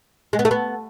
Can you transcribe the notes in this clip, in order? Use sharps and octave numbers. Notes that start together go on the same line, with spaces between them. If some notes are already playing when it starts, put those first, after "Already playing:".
G#3
B3
A3
B3